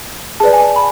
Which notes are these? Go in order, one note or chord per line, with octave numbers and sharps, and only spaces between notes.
G#4 B4 D5 A5
G#5
A5
B5